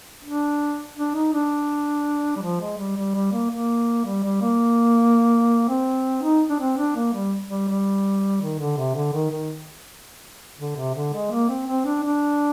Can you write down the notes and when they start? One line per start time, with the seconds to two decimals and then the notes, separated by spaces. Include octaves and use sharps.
0.25 D4
0.97 D4
1.15 D#4
1.33 D4
2.36 G3
2.42 F3
2.61 G#3
2.78 G3
2.97 G3
3.15 G3
3.32 A#3
3.51 A#3
4.06 G3
4.23 G3
4.41 A#3
5.69 C4
6.23 D#4
6.50 D4
6.59 C4
6.78 D4
6.96 A#3
7.13 G3
7.50 G3
7.68 G3
8.41 D#3
8.59 D3
8.77 C3
8.95 D3
9.13 D#3
9.31 D#3
10.59 D3
10.77 C3
10.95 D3
11.13 G#3
11.32 A#3
11.49 C4
11.67 C4
11.86 D4
12.04 D4